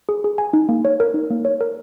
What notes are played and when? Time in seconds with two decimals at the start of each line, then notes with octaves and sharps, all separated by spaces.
0.09 G#4
0.24 G#4
0.38 G#5
0.53 D#4
0.69 A#3
0.85 C#5
1.00 A#4
1.14 D#4
1.30 A#3
1.45 C#5
1.61 A#4